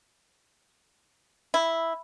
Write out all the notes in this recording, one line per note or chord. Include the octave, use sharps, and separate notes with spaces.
E4